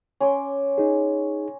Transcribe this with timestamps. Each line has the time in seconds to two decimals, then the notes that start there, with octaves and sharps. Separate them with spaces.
0.20 C#4 C6 D6
0.78 D#4 G#4